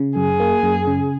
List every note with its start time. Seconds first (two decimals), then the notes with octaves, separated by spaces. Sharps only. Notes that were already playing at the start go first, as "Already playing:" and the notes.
Already playing: C#3
0.15 F#2 G#4
0.40 A#3
0.63 F#2
0.87 C#3